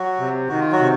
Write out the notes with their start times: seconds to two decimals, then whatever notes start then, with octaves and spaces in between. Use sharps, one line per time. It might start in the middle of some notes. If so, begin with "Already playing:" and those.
Already playing: F#3 F#4
0.19 C3
0.49 D#3 F#4
0.60 F4
0.72 F#3 F#4
0.80 C3